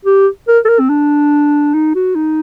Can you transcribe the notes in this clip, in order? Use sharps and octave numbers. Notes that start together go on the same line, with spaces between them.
G4
A#4
A4
A#4
C4
D4
D#4
F#4
D#4